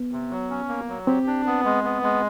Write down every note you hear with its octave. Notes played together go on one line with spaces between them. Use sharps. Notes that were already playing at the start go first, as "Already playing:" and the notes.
Already playing: B3
C3
F#3
C#4
A#3
F#3
C4 G4
D4
B3
G#3
B3
G#3